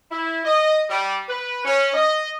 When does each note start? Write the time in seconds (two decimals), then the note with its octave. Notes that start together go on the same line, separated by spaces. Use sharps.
0.11 E4
0.45 D#5
0.90 G3
1.28 B4
1.65 C#4
1.94 D#5